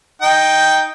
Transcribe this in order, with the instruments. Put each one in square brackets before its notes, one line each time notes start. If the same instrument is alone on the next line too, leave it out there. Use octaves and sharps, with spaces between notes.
[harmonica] D#4 G5